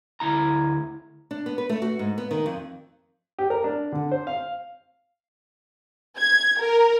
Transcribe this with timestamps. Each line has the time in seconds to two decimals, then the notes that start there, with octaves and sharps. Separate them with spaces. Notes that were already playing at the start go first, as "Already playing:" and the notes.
0.20 D2 E4 A#5
1.31 D4
1.46 B3
1.58 B4
1.69 A3
1.82 F#4
1.99 G#2
2.18 B3
2.31 D#3
2.46 F2
3.39 G4
3.50 A#4
3.64 D4
3.92 D3
4.11 C5
4.27 F5
6.17 G#6
6.60 A#4